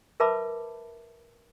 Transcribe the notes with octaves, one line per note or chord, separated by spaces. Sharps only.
A#4 B4 E5 A5 B5 D6